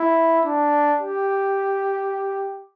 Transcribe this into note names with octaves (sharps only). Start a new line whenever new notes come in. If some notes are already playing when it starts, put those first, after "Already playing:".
Already playing: E4
D4
G4